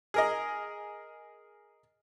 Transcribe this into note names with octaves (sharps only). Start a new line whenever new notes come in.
G#4 A#4 D#5